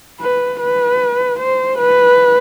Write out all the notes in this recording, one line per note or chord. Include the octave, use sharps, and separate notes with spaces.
B4
B4
C5
B4